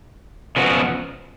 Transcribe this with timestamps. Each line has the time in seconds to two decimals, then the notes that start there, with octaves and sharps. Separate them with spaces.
0.56 C#3 F3 B3 F#4